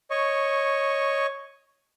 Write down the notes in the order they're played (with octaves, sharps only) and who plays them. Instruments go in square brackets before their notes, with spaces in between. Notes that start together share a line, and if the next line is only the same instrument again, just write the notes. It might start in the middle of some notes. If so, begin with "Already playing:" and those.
[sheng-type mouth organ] C#5 D#5 C#6